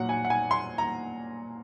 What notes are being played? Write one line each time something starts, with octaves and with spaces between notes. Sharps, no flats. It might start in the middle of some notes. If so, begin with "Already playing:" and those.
Already playing: A#2 F#3 F#5
G#5
F#5
G#5
C6
A#5